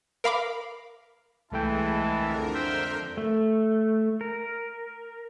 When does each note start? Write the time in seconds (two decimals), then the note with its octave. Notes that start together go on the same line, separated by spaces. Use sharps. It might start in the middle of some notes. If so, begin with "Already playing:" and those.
0.24 A#4 F5 B5 D6
1.52 C2 E3 G#3 A3 E4 G5 A5
2.17 F2 D3 A#4
2.54 C5 E5 G5
3.17 A3
4.21 A#4